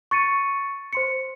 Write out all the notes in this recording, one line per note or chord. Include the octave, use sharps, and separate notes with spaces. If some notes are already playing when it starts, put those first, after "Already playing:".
C#6 A6 C#7 D#7
C5 C6 C#7